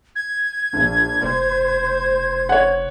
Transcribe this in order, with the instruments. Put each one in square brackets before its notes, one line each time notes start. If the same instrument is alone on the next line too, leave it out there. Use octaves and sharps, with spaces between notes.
[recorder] G#6
[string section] A#1 [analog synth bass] D4
[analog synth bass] F1 [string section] C5
[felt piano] C#5 F#5